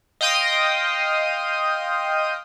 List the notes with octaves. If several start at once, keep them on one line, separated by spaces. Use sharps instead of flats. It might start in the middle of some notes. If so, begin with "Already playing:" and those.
D#5 F5 G5 C6 D#6